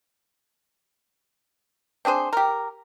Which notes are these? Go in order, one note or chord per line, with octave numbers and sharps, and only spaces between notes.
C4 D4 G#4 C5
G4 A#4